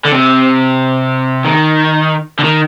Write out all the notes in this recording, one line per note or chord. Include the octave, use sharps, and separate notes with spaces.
D3
C3
D#3
D3
D#3